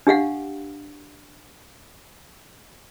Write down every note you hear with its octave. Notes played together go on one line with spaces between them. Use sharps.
D4 G4 F5 F#5